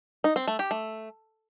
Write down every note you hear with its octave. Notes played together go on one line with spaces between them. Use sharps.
D#4
C4
A3
G4
A3